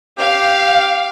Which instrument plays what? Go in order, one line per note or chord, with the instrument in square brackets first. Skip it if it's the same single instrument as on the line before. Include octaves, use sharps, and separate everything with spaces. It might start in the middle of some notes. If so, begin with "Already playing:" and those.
[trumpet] G4 [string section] F5